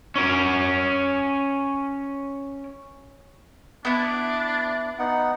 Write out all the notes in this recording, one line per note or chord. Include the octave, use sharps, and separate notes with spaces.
C#4 A#4
B3 D4 E4
B3 D#4 F#5